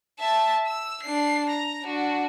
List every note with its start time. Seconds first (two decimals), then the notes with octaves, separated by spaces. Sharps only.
0.19 E5 A5
0.66 E6
1.03 D4 C7
1.49 A#5
1.83 D4 F#4